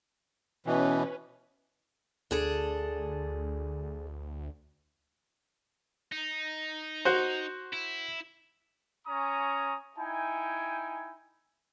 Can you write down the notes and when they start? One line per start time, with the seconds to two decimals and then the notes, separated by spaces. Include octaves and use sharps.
0.66 B2 E3 C#4 B4
2.31 D2 D4 G#4 A4
6.12 D#4
7.05 F#4 C5
7.73 E4
9.06 C#4 G#5 A#5 C#6 D#6
9.97 D#4 E4 G5 G#5